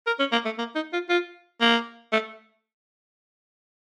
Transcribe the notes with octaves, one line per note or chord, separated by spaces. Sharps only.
A#4
C#4
A#3
A3
A#3
D#4
F4
F4
A#3
A3